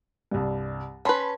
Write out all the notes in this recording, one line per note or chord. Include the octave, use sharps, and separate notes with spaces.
C2 G2
C#4 B4 A5 B5 C6